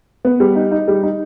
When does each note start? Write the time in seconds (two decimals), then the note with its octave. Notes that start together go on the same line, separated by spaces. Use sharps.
0.25 B3
0.40 G3
0.55 D#4
0.72 D#4
0.88 G3
1.03 D#4